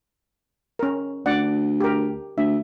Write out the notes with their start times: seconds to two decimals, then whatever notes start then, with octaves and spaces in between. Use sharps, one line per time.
0.79 C#4 A#4
1.26 D2 D5 F#5
1.81 G4 A#4
2.38 D2 E5